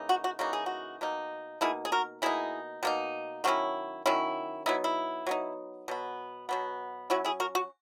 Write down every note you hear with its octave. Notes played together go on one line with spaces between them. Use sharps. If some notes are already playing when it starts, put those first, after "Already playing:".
Already playing: C#3 E3 A#3 D#4
F#4
F#4
C#3 E3 A#3 D#4 F#4
G#4
F#4
B2 A#3 D#4
B2 A#3 D#4 E4 G#4
G#4
F#4 A#4
B2 A#3 D#4 E4 G#4
B2 A#3 D#4
D#3 F#3 C#4 E4 F#4
D#3 F#3 C#4 E4
F#3 B3 D#4 E4
E4
F#3 B3 D#4
B2 F#3 B3
B2 F#3 B3
F#3 C#4 E4 F#4
E4 G#4
F#4 A#4
F#4